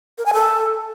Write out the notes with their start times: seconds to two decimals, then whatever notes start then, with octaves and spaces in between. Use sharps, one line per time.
0.18 A#4
0.26 G#5
0.33 A4